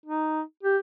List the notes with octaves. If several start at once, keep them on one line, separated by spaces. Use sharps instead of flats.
D#4
G4